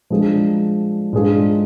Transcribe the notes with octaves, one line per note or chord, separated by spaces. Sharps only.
F3 G#3 D4 G#4
G#2 G#3 D4 F4 G#4